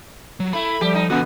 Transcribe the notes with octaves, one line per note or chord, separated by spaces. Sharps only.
F#3
A3 E4 B5
F3 G3 G4
D#4
C#3 E3 B3 F#4